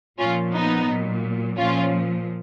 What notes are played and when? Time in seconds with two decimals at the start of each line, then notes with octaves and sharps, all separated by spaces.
0.18 A#2 F3 C#4 F4
0.53 B3 D#4
0.88 A#2 F#3
1.57 A#2 F3 C#4 F4